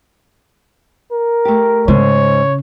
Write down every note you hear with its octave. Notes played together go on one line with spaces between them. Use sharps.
A#4
A3 G4
G#2 C#3 C#5